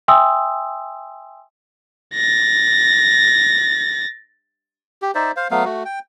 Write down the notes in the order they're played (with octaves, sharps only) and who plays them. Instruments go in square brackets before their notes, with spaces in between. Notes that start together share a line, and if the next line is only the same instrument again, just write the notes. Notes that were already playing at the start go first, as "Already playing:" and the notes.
[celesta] E5 G5 G#5 C6 D#6 E6
[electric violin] A6 A#6
[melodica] G4
D#4 C5 D5 E5
C5 F5
F#3 A3 B3 F5
A3 F#4
G5